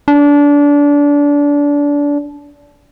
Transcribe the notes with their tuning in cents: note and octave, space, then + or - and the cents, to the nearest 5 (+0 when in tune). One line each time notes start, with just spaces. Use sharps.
D4 -25